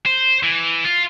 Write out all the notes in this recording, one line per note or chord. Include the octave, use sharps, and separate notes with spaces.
C5
E3
F4